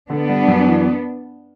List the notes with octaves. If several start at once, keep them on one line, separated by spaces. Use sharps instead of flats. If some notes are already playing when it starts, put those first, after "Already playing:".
D3 B3 D4
G3
F#2
E3